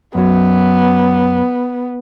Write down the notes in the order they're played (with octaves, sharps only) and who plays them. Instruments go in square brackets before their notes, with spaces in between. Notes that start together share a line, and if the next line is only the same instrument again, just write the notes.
[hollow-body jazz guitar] F#2 F#3 [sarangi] B3